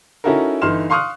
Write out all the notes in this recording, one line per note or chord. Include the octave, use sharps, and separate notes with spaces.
C#4 D#4 E4 F#4 A4 A#4
G1 E3 D#4 C6 F6 E7
F5 C6 C#6 D#6 F6 F#6